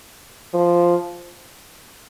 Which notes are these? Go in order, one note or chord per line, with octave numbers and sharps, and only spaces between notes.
F3